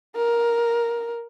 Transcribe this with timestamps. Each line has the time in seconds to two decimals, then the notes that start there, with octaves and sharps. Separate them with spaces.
0.16 A#4